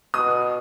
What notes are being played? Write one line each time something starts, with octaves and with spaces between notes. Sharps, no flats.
B2 D#6